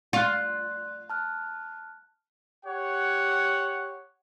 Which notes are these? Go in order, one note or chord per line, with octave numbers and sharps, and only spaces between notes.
F4 D5 C6 F#6
A5 F6 F#6
G4 C#5 F#5